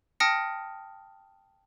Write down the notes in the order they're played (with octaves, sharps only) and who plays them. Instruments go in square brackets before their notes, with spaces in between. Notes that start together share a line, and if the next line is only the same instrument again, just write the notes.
[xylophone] G5 A5 D#6 F6 A#6 C#7